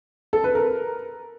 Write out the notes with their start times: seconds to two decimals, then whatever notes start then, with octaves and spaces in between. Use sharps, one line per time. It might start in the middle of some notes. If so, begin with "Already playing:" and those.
0.33 A4
0.44 B4
0.55 A#4